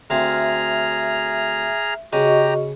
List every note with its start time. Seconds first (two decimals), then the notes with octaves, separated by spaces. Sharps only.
0.10 D2 C4 G#4 E5 F5 A#5 F6
2.13 C#3 F#4 G4 D#5 A#5 C#6